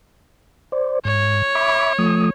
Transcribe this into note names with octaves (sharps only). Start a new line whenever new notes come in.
C5 D5
G#2 C#5
E5 B5 D6
F3 A3 D#6